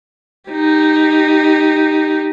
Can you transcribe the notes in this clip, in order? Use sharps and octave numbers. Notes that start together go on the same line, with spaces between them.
D#4 G4